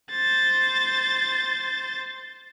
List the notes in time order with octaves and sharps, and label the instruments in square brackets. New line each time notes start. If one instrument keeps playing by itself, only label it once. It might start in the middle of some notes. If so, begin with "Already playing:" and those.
[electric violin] C5 A6